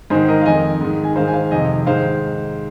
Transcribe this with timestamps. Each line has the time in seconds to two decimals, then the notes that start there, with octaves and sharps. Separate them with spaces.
0.10 G#2 D#3 G#4 C5
0.28 A#4 D#5
0.41 F5
0.46 F2 D#3 D#5 G#5
0.81 G#2 D#3
1.04 G#5
1.16 G#2 D#3 C5 F5
1.28 G#5
1.34 C5 F5
1.51 F2 C3 D#3 D#5 G#5
1.87 G#2 D#3 C5 F5